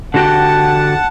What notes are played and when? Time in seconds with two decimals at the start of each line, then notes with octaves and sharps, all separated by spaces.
0.14 D3 F#4 G4 F#5 A5